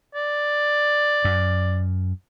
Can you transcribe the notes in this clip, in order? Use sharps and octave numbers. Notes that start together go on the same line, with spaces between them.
D5
F#2